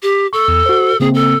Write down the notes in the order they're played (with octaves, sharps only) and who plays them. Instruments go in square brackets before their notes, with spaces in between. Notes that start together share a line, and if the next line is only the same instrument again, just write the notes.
[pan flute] G4
[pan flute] A4 [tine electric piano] C#6
[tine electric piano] E2
F#4 C5
[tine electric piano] C#3 A#3 C4 [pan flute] G#4
[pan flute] A4